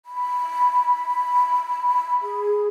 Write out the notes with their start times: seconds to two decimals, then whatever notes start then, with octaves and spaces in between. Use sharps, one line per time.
0.06 B5
2.22 G#4